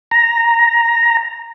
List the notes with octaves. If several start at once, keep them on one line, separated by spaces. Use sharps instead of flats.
A#5